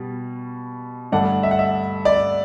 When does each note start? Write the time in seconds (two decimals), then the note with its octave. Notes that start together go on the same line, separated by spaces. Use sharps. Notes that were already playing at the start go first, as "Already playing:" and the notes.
Already playing: B2 G3
1.12 G2 D3 A3 D4 F#5
1.43 E5
1.51 F#5
1.59 E5
2.05 D5